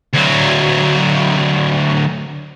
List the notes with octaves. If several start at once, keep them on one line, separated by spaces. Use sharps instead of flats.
D2 F#3